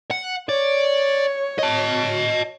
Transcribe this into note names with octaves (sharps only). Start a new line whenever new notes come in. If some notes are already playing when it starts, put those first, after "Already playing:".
F#5
C#5 D5
D#5 A5